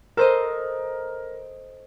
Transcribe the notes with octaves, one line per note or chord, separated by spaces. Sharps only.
A4 A#4 C5 D#5